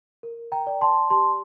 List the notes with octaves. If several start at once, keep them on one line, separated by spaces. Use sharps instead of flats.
A#4
G5 A#5
D5
A5 C6
G4 A5 C6